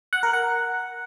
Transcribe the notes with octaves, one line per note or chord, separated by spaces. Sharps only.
F#5
A#4
F#5